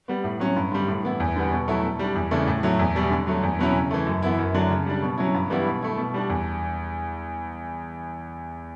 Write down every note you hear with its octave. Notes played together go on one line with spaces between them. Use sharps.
G3 B3
A2
F#3 C#4
G2
D3 G3
A2
E3 B3 E4
E2
D3 G3 B3
B2
F#3 A3 E4
B2
G3 D4
E2
C#3 E3 A3 D4
A2
F#3 A3 E4
E2
B2 G3
D3
F#3 A3
E2
B2 F#3 C#4 E4
C#3
E3 A3
F#2
E3 B3 E4
F#2
D3 F#3 A3 D4
C#3
G3 D4
B2
F#3 C#4 E4
G2
E3 G3 B3 E4
B2
A3 E4
B2
G3 D4
E2